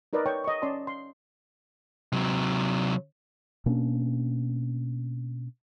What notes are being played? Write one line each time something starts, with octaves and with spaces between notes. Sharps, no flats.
D#4 A#4 B4 D5 D#5
C#5 G5 C#6
D#5 C#6
C#4 D5 A5 C6
C6
C3 F#3
B2 A#3 C#4 D4